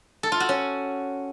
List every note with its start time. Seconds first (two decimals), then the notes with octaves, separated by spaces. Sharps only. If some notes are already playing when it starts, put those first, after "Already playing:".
0.23 A4
0.32 F4
0.40 F#4
0.49 C#4